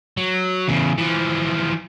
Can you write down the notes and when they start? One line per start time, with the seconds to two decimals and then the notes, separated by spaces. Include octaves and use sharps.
0.17 F#3
0.68 E2 C#3
0.98 E3 F3